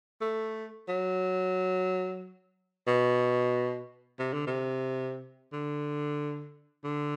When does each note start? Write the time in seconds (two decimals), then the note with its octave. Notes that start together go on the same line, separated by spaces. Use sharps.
0.21 A3
0.89 F#3
2.88 B2
4.19 C3
4.34 D3
4.47 C3
5.53 D3
6.84 D3